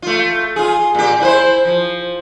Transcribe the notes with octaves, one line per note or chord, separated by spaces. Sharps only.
A3 F4
F4 G#4
A#2 G4
E4 B4 C5
F3